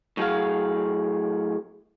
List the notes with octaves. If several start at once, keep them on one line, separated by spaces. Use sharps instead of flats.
A2 F#3 G#4 F5